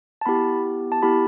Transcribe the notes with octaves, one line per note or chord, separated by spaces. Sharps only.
A5
B3 E4 G4 B5
A5
B3 E4 G4 B5